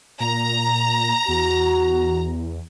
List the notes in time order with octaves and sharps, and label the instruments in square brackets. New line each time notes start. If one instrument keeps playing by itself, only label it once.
[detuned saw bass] A#2 [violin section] A#5
[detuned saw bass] E2 [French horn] F#4